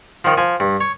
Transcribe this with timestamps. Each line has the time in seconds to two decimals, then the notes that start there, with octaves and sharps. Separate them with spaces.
0.24 D#3 F3
0.37 F3 G#5
0.60 G2
0.80 C#5